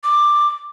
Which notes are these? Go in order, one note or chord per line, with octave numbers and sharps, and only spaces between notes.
D6